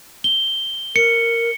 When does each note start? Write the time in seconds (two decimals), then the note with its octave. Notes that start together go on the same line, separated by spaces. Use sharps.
0.24 G7
0.96 A#4 C#7